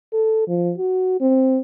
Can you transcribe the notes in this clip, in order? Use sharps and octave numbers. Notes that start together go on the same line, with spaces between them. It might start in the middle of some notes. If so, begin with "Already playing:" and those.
A4
F3
F#4
C4